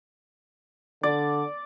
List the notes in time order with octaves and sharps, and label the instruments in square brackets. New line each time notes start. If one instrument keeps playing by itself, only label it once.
[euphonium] D3 [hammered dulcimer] D5